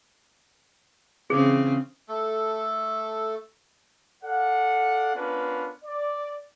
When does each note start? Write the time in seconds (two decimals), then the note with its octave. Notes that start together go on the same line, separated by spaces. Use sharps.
1.30 C#3 E3 C4 G#4
2.09 A3 A4
4.24 A4 D5 F5 F#5
5.15 B3 C#4 D4 F4 A#4 B4
5.84 D5